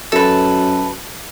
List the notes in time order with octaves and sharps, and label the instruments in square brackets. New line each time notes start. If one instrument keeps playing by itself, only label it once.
[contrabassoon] F#2 [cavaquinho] A4 B4